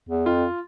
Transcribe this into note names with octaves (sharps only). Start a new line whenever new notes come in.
E2
F2 F4